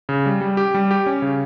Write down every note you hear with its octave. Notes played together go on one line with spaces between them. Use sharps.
C#3
G3
G3
G4
G3
G4
C#4
C#3